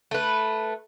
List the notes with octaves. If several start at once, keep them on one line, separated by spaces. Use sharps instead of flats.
A3 B4